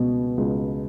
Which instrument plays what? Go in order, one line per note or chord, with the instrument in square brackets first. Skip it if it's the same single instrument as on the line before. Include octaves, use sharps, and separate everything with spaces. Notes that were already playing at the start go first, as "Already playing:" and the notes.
Already playing: [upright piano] C#2 B2
C#2